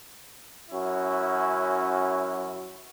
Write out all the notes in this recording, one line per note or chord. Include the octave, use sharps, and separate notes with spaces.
F#2 C#4 E4 F#4